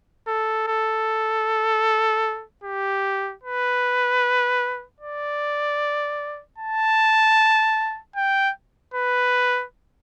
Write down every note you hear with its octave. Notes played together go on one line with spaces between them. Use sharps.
A4
A4
G4
B4
D5
A5
G5
B4